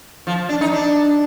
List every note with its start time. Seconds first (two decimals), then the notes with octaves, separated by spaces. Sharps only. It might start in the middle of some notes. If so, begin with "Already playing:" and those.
0.27 F3
0.49 D4
0.61 D#4
0.73 D4